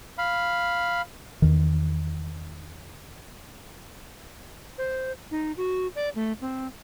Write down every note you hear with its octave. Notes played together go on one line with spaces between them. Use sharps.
F5 B5
E2 D#3
C5
D#4
F#4
D5
A3
C4